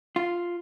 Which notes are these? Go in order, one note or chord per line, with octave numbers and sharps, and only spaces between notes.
F4